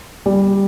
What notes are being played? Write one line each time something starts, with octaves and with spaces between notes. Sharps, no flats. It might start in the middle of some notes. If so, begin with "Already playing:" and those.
G3